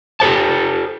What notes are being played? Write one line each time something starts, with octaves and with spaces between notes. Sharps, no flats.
G4 A4 C5 A5